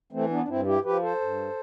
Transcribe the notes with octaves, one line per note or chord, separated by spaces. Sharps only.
E3 A3 C4
B3 D4
D4
G2 C4 E4
E4 G4
F3 G4 B4
A4 C5
G2